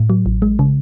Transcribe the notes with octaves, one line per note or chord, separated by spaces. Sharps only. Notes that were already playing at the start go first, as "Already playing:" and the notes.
Already playing: A2
F#3
A1
G#3
C#3